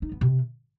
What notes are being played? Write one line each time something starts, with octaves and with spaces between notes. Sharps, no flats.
D#4
B3
C3